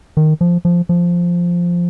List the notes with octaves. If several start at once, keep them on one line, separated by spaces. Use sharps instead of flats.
D#3
F3
F3
F3